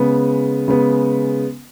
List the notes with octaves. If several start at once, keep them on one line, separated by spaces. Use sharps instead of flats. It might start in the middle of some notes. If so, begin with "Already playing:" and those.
Already playing: C#3 G#3 B3
C#3 G#3 B3